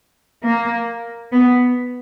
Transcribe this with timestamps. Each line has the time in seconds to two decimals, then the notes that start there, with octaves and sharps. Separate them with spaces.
0.44 A#3
1.32 B3